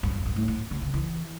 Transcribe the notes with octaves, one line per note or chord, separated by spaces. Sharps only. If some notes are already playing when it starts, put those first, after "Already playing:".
G2
F2
G2
A2
A2
D3
C#3
E3